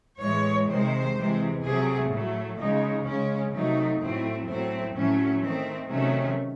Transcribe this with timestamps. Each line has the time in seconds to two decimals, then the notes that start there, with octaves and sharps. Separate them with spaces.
0.20 A2 E3 G#3 C#5
0.68 C3 D#3 G#3 C5
1.15 C3 E3 G#3
1.62 C3 F#3 A3 G#4
2.09 A2 F#3 A3
2.57 C#3 G#3 D#4
3.04 C#3 G#3 C#4
3.52 C3 F#3 A3 D#4
3.99 A2 F#3 A3 C4
4.46 A2 F#3 A3 C4
4.94 A2 F#3 A3 C#4
5.41 D#3 A3 C4
5.89 C3 D#3 F#3 A3 C#4